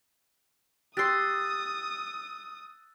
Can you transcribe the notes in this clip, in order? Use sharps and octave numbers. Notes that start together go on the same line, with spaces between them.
G4 C6 D#6 E6 F#6 A6